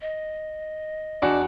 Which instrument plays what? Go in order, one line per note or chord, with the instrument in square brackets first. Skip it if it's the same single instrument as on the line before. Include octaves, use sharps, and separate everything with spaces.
[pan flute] D#5
[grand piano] E2 F#4 [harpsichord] D4